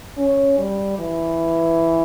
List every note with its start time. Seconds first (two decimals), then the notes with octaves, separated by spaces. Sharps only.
0.17 C#4
0.59 G3
0.99 E3